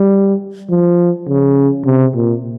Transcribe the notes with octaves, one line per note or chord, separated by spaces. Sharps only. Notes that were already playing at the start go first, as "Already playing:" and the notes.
Already playing: G3
F3
C#3
C3
A#2